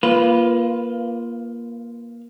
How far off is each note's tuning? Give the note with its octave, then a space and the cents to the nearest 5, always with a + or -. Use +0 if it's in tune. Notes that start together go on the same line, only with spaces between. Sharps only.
A#3 +15 F4 -15 B4 +0